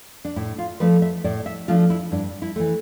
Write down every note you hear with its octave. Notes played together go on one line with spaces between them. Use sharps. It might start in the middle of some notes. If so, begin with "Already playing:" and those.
D4
A2 E4
F4
F3 A3 D4 B4
E5
A2 D5
E5
F3 A3 D4 F4
E4
G2 D4
E4
E3 A3